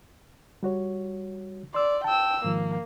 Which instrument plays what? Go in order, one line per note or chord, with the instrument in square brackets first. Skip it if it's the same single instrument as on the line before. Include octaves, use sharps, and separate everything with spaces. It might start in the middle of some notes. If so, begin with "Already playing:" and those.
[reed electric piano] G3 F#4 C#5
[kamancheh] D5 [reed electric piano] C6 E6
[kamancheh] G5 E6 [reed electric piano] A5
[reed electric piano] G#2 D#3 F3 [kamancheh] A#3